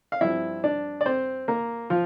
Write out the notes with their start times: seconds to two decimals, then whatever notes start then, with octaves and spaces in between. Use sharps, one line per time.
0.12 F5
0.21 G2 F3 C4 E4 E5
0.64 D4 D5
1.01 D5
1.06 C4 C5
1.48 A#3 A#4
1.90 F3 F4